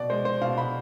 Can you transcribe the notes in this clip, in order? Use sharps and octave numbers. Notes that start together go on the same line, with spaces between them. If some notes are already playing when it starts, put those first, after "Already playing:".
Already playing: B2 D5
G#3 C5
C5
B2 F5
B5